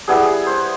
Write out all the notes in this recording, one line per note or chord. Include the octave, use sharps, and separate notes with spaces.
G3 B3 E4 G#4
C5